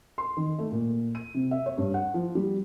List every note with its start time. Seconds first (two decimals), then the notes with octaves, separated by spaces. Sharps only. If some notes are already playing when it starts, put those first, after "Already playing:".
0.18 C6
0.37 D#3
0.59 A3
0.71 A#2
1.15 D#7
1.34 C3
1.51 E5
1.66 C#5
1.78 G2
1.94 F#5
2.14 F3
2.35 G3